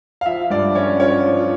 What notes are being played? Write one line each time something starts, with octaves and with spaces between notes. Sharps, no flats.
F5
F3 E5
G2 D5
C#4 C#5
F4 C#5
F3